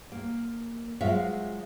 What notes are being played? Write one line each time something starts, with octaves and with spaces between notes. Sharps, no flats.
A#3
F#3 G#3 F4 C5 E5 F5